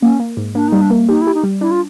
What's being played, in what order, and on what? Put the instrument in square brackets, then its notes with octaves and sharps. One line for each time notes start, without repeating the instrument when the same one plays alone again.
[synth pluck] A#3 [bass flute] C#4
[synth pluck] A#3
G#2
[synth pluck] A#3 [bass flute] D4
[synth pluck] G3 [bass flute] D#4
[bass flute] D4
[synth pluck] A#3
[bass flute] D#4 [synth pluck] G4
[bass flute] E4
[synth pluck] G4
[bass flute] D#4
[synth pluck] G3
[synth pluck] D4 [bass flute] E4
[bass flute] F4